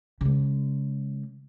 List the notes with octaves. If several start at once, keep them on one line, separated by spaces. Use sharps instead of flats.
C#3 G#3